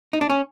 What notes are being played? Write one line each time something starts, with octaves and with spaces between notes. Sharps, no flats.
D#4
D4
C#4